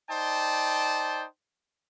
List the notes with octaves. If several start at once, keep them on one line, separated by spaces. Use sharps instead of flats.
D#4 C5 D5 G5 A5